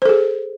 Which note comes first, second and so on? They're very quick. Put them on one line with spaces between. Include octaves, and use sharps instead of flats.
C5 A4 G#4